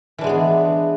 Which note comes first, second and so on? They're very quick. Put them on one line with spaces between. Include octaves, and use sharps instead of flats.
E3 D4 G#3 B3 G#4